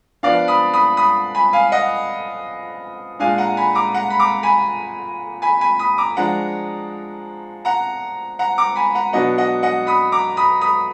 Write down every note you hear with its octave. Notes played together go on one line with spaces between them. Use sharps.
F3 B3 D4 D5 F5
B5 D#6
B5 D#6
B5 D#6
G#5 B5
F5 G#5
D#5 F#5
A#2 G#3 D4 F5 G#5
F#5 A#5
G#5 B5
A#5 D6
F#5 A#5
B5
A#5 D6
G#5 B5
G#5 B5
G#5 B5
B5 D#6
A#5 D6
F3 G#3 D4 F#5 A#5
F#5 A#5
F#5 A#5
A#5 D6
G#5 B5
F#5 A#5
B2 F#3 B3 D4 D#5 F#5
D#5 F#5
D#5 F#5
B5 D#6
A#5 D6
B5 D#6
B5 D#6